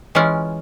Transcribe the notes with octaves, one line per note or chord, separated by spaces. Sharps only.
E3 G#3 C#4 F4